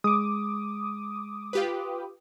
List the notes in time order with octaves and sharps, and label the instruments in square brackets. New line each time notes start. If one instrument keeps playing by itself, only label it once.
[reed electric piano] G#3 [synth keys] D6 D#6
[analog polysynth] F4 G4 B4